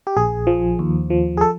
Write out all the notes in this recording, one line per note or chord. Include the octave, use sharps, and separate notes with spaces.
G4
A#1 G#4
F3
D#2
F3
G#4
A4